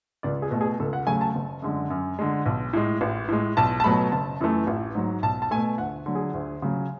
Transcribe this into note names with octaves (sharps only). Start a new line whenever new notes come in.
C#2 D5
G#4
B2 A3
G#4
C#2 A4
F#5
C#3 F#3 A3 G#5
A5
F#1
F#2 D3 G#3
F#2
D3 G#3
B1
A2 G#3
A1
A2 G#3
B1 A5
A5
B2 F#3 A3 B5
F#1 A5
F#2 E3 A3
A1
G#2 F#3
B1 A5
A5
B2 A3 G#5
D2 F#5
D3 F#3
G#4
D2
C#3 F#3